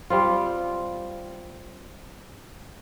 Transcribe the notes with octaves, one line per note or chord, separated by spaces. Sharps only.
G3 C4 F4